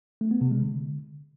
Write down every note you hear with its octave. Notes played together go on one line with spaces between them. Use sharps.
A3
B3
C3
G#3
D3